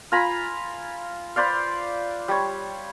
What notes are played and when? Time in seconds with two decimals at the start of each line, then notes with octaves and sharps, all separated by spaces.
0.12 F4 G#5 A#5 B5
1.36 B4 C5 D5 F5
2.28 G3 C#5